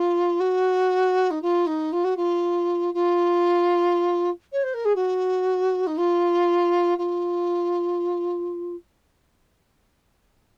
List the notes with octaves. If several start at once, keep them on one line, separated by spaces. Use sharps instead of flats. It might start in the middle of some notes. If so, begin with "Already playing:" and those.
Already playing: F4
F#4
D#4
F4
D#4
F4
F#4
F4
F4
C#5
C5
A#4
G#4
F#4
D#4
F4
F4